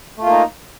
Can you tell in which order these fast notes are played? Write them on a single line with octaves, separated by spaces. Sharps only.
A3 F4 A#3 D#4